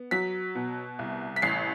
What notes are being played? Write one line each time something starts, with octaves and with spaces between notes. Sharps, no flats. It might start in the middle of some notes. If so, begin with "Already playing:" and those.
Already playing: B3
F#3 B6
B2
C2
B6
A1 C7